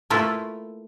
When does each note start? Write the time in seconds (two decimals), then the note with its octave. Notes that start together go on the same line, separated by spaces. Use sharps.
0.10 A3 A#3 E4 F4 B4